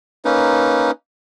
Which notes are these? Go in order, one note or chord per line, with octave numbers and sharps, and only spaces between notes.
A#3 C#4 D#4 B4